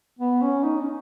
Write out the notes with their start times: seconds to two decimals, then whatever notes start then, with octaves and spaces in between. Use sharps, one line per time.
0.19 B3
0.42 C#4
0.64 D#4
0.81 C#4